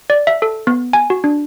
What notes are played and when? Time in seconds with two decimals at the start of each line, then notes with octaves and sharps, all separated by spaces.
0.10 D5
0.27 E5
0.42 A4
0.67 B3
0.93 G#5
1.10 F#4
1.24 D4